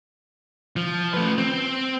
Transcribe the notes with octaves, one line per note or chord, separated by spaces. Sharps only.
F3
A3 B4
C4